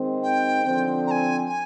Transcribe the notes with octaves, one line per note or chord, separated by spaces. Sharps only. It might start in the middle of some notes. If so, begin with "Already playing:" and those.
Already playing: D#3 G#3 C4
G5
D3 F3 C4
A#5
G#5
G#5